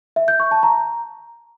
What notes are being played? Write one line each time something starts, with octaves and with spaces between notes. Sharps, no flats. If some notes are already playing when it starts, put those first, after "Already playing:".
E5
G6
C#6
A5
A#5